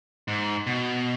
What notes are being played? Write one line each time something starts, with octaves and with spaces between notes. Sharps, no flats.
G#2
B2